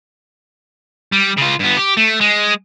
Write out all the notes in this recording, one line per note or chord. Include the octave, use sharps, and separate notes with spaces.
G3
C#3 F4
G2 B3
G4
A3
G#3